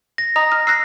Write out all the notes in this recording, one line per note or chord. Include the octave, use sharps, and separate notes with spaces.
A#6
D#5 A#5 D#6
F6
E6 F#6 A#6 C7